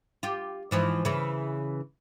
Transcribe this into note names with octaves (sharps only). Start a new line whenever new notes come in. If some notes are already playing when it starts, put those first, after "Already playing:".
F4 G4
G#2 E3 F3
C#3 E3